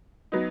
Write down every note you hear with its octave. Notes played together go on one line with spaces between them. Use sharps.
F#3 B3 D#4